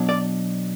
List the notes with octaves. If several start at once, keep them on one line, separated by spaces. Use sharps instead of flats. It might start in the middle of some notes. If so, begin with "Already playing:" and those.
Already playing: B2 F#3 D4
D5